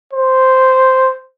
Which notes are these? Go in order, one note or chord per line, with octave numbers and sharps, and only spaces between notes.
C5